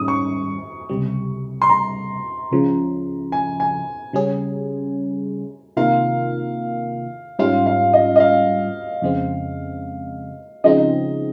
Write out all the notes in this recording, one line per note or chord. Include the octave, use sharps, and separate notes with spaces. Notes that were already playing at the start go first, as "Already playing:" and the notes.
Already playing: G#2 D#3 G3 C#4 D#6
C#6
C#2 C3 G3
C6
A#5
C#2 C#3 F3
G#5
G#5
C#3 G3 C#4 G#4
C3 D#3 A#3 F4 A#4 F5
G#2 G3 C#4 F4 F5
F5
D#5
D#5
F5
F2 C#3 G#3 C4
C#3 F3 G#3 C4 D#4 D#5